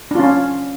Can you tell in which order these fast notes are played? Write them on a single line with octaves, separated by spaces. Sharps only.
D4 F4 C#4